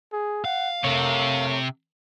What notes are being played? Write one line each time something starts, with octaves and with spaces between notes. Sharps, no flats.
G#4
F5 F#5
C3 A3 A#4 C#5